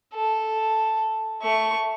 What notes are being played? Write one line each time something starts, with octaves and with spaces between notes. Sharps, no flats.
A4
A3 C#6